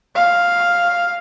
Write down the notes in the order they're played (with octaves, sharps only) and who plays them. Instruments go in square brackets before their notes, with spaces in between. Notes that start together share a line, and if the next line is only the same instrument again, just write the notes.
[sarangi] F5